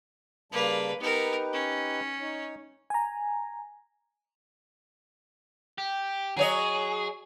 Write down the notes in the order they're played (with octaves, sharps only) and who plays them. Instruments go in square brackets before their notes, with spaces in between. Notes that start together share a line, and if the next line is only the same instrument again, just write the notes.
[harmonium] C#3 G3 A5 [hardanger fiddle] A#3 B4
[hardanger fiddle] B3 A#4 [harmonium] D#4 G4 B4
[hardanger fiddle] C#4
[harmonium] D#4 C#5
[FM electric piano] G#5 A#5
[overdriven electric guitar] G4
[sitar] F#3 C#5 D#5 [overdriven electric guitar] G#4